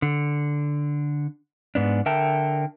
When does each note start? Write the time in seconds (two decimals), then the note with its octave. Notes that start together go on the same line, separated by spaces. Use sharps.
0.02 D3
1.75 G#2 B3 D4
2.06 D3 A#4 E5 G5 A5